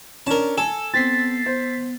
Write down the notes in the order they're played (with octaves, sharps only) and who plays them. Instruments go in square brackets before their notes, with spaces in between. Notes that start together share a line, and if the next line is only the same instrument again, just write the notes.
[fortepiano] C#4 D4 [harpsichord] A#4 A5
[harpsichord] A4 [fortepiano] G#5 [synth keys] E7
[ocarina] B3 [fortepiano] C4 [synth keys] A6 B6 C7
[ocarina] B3 [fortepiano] C5